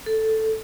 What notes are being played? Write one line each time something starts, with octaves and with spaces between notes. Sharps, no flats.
A4